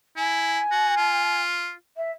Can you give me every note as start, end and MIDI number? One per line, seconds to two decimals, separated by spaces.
0.17 0.60 64
0.17 1.38 80
0.71 0.96 66
0.97 1.73 65
1.96 2.11 76